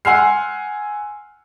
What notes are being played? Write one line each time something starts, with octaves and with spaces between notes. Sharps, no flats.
F#5 G#5 C6 E6 F6 C7